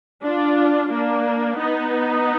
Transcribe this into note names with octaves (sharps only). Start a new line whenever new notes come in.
D4 F4
A#3 D4
B3 D#4